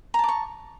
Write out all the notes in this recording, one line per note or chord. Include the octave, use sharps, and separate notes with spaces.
A5 A#5 C#6 D6